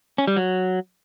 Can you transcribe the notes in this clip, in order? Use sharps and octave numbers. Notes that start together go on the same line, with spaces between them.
C#4
G3
F#3